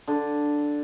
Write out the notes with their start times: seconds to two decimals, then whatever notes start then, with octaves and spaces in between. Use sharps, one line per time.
0.08 D3